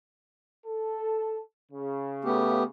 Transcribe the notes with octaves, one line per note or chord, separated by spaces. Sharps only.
A4
C#3
A3 B3 G4